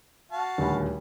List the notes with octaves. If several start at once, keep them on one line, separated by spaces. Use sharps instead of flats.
F#4 F5 A5
D#1 D2 B5